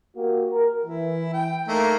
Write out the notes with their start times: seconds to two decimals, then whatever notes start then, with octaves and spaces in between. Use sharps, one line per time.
0.15 A#3 F#4 G4
0.51 A#4
0.84 E3 E4
1.34 G5
1.68 A3 A#3 D#4